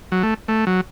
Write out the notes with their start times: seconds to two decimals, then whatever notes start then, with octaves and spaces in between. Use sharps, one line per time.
0.12 F#3
0.23 A3
0.48 A3
0.67 F#3